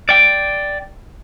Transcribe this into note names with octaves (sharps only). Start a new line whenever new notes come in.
D5 G5